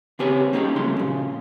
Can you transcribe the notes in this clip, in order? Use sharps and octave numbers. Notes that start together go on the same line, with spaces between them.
C#3 C4 G4 G#4 B4 C#5
A#3 C#4 D#4 F4 G4 G#4
C2 F2 C#3 F#3 A3 C6
A#2 C#3